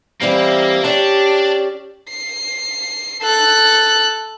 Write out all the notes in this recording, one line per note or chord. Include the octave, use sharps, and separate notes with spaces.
E3 G3 A#3 C4
C#4 D4 G4 D5
C7
A4 F#6